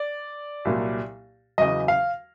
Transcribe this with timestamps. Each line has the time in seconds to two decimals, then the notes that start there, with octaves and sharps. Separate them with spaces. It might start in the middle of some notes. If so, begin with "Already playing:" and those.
Already playing: D5
0.65 C2 A#2 F#3
1.58 E2 C#3 F#3 D#5
1.88 F5